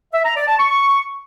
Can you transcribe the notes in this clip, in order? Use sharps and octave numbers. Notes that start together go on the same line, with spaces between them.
E5
A#5
D5
A5
C#6